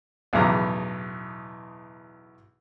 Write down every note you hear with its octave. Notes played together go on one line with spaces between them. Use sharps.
B1 E2 A2 C#3 A#5 D6